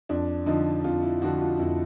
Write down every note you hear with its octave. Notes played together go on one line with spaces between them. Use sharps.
F2 D4
D3 F3 D#4
F2 F4
E4
D3 F3 F#4
F4
F2 E4